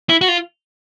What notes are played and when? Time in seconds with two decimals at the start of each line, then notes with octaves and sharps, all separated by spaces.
0.09 E4
0.21 F#4
0.28 F4